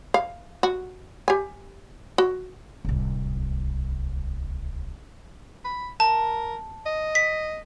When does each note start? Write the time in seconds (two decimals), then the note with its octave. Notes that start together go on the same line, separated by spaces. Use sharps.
0.14 F5
0.63 F#4
1.28 G4 G#5
2.18 F#4
2.85 D1 C2
5.64 B5
6.00 A#4 A5
6.86 D#5
7.15 B6